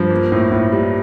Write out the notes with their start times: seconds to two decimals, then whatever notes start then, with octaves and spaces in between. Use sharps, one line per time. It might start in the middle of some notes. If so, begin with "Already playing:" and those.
Already playing: G2 F3
0.11 A#3
0.32 A2
0.52 A2
0.72 G3